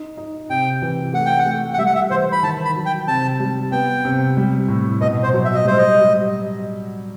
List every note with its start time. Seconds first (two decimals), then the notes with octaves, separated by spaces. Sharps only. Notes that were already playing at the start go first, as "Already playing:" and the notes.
Already playing: D#4
0.17 D#4
0.50 C3 G5
0.82 E3
1.13 A3 F#5
1.26 G5
1.39 F#5
1.46 A3
1.74 F#5
1.78 G3 E5
1.86 F#5
1.95 E5
2.11 E3 C5
2.32 B5
2.43 D#3 A5
2.65 B5
2.76 F#3
2.86 G5
3.07 C3 A5
3.40 G3
3.72 B3 G5
4.05 C3
4.37 G3
4.68 A2
5.01 B2 D#5
5.23 C5
5.33 F#3
5.44 E5
5.55 D#5
5.65 G3 C5
5.78 D#5
5.98 G3